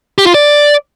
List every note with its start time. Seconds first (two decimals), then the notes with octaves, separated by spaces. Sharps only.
0.18 G4
0.26 F4
0.34 D5